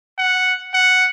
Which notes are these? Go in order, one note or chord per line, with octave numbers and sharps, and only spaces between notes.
F#5
F#5